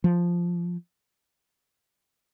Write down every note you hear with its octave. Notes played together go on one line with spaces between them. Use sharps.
F3